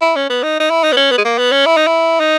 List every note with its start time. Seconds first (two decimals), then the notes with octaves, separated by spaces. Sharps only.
0.02 E4
0.16 C#4
0.30 B3
0.43 D#4
0.60 D#4
0.71 E4
0.84 D#4
0.93 B3
0.97 C#4
1.12 B3
1.18 G#3
1.25 A#3
1.38 B3
1.52 C#4
1.66 E4
1.77 D#4
1.87 E4
2.20 D#4